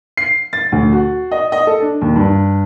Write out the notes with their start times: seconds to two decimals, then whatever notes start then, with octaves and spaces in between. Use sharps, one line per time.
0.17 C7
0.53 A6
0.72 D2
0.92 F#4
1.31 D#5
1.52 D#5
1.67 A4
1.81 D4
2.01 D#2
2.16 G2